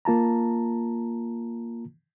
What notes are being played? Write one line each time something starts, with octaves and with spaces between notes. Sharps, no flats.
A#3 F4 A5 A#5